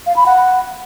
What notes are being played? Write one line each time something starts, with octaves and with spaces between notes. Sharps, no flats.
F5
B5
F#5